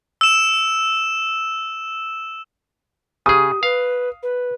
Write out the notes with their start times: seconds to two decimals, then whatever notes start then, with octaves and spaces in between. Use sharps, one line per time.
0.21 E6 E7
3.26 C#3 G4 G#4 D#6
3.63 B4 F5
4.23 B4